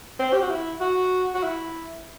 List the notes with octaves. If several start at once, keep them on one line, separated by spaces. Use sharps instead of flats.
C4
G4
F#4
E4
F#4
F#4
E4